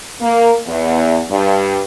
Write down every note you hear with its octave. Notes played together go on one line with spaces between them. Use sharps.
A#3
E2
G2